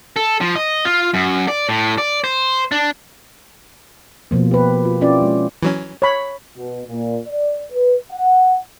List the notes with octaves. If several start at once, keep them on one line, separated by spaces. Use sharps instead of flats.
A4
F3
D#5
F4
F#2
D5
A2
D5
C5
D4
B2 F3 A#3
G4 B4
F4
C4 C#4 E4 F4 G4 D5
G#3
E3 F#3 C#4
C#5 B5
B2
A#2
D5
B4
F#5